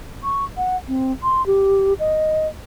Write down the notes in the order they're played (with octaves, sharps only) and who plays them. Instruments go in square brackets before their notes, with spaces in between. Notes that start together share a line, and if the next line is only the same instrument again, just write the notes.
[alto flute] C#6
F#5
C4
C6
G4
D#5